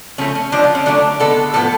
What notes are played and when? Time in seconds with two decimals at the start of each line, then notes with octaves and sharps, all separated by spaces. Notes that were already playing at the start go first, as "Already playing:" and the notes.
0.18 C#3 F3 A3 C#4
0.35 C#4
0.52 D3 F3 G#3 D4
0.64 F4
0.75 C#4
0.86 D3 F#3 A3 D4
1.20 D3 G#3 B3 A4
1.54 A2 F3 B3 A4